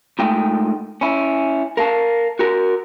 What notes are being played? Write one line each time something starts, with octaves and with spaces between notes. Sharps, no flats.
A#2 G#3 A3 D#4 G5
C#4 E4
A#4 F5 A5
F#4 A#4